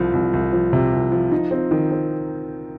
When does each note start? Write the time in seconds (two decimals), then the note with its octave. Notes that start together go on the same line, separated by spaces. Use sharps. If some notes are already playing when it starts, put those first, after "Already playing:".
Already playing: C2 F3
0.13 C2
0.33 C2
0.53 F3
0.73 C3
0.92 C2
1.12 F3
1.32 D#4
1.51 C4
1.71 D#3
1.91 C4